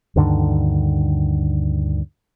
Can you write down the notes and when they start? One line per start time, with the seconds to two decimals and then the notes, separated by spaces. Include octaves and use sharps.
0.16 D2 G2 D3 D#3